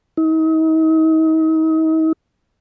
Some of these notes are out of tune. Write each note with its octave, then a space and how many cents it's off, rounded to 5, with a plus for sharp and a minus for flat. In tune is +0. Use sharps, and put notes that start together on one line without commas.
D#4 +40